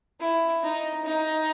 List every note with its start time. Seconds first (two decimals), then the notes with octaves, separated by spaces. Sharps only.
0.20 E4
0.63 D#4
1.05 D#4